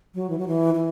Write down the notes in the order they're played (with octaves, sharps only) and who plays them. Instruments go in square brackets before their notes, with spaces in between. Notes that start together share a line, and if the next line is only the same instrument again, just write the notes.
[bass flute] F#3
E3
F#3
E3
E3